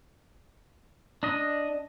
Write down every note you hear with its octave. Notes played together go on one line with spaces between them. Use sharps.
D4 D#5